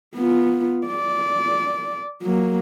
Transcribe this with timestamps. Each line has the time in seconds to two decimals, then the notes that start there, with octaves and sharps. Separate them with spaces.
0.15 B3 F4
0.86 D5
2.22 F#3 A#3